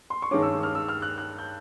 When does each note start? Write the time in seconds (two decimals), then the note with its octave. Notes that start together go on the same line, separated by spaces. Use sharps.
0.10 C6
0.22 C#6
0.31 G2 D#3 G#3 C#4 D6
0.42 E6
0.63 F6
0.75 E6
0.89 F6
1.02 F#6
1.18 F#6
1.39 G6